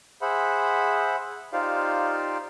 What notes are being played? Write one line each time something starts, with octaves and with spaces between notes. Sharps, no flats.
G#4 C5 E5 F#5 B5
D#4 F4 G4 C5 D5 F5